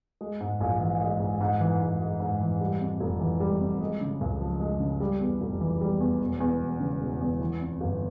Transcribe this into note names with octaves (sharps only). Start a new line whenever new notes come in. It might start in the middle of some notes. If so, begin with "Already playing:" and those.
G#3
G#2
A#1
E3
G#3
G#2
G#2
E3
G#2
G#3
G#2
E3
G3
F2
F1
E3
G3
F2
G#3
C#3
C#2
F3
G#3
C#3
G3
E2
F1
E3
G3
E2
E1
E2
E1
C#3
E1
E2
E3
F2
G1